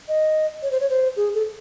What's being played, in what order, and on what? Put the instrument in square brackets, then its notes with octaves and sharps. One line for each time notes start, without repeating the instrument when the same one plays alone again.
[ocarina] D#5
C#5
C5
C#5
C5
G#4
A4